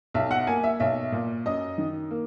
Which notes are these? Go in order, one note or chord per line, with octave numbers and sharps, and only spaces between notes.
B1 E5
F#5
A#3 G#5
E5
B1 E5
A#2
F#2 D#5
D#3
A#3